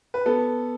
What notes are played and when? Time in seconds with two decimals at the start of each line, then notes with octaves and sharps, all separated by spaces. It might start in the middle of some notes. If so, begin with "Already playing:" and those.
0.14 B4
0.26 B3 A4